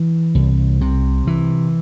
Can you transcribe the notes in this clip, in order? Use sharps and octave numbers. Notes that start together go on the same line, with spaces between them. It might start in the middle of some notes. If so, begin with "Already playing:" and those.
Already playing: E3
C2
C3
E3